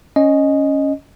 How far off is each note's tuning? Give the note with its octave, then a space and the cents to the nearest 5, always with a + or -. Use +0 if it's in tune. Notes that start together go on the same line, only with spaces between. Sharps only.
C#4 +0 D#5 -5